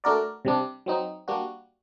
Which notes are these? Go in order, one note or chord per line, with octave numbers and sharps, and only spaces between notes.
A3 D4 F#4 A#4 D5
C3 G3 D4
F#3 C4 D#4
G3 A#3 D4 F#4